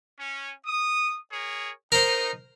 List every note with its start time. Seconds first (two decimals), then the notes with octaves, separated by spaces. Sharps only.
0.18 C#4
0.65 D#6
1.30 G#4 A#4 C#5
1.92 D#4 A#4 C5